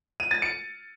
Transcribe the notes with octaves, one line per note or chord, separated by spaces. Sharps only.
D#7
A6
C#7